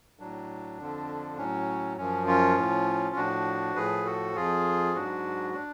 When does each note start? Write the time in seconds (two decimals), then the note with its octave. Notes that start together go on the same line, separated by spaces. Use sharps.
0.19 A2 F#3 D4
0.79 F2 D3 F3
1.37 A2 F#3 C#4
1.97 F#2 F3 C#4
2.27 C#4 F4
2.57 A2 F3
3.16 A2 F3 D4 F#4
3.76 A2 F3 G#4 B4
4.05 F#4 A4
4.35 F2 F3 F4 G#4
4.94 G#2 F#3 D4 F#4
5.54 D4